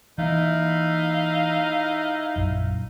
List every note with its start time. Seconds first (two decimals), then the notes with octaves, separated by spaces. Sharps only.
0.18 E3 A#3 D#4 E4 F5
2.36 A#1 F#2